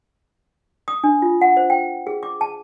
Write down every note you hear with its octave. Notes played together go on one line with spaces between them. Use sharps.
D#6
D4
F4
F#5
C5
G5
G#4
D6
A5